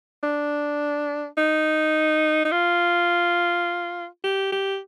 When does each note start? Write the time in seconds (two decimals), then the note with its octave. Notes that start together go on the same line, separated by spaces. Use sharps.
0.23 D4
1.37 D#4
2.45 D#4
2.52 F4
4.24 G4
4.52 G4